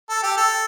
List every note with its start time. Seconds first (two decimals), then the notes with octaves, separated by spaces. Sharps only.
0.10 A4
0.23 G4
0.37 A4